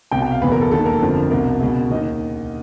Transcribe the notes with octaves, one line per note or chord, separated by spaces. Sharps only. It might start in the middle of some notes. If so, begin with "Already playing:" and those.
C2 B2 G5
G5
F5
F#1 E2 B2 B4
A#4
A4
E1 D#2 D#3 A4
A#4
G1 F2 D3 F3
C2 B2 A#4
C#2 B2
D#2 D#3 D#5